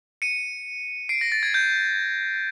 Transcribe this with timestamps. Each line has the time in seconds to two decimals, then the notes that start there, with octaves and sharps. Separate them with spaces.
0.22 C#7 D#7
1.09 C7 D7
1.21 A#6
1.32 A6
1.43 G#6
1.54 G6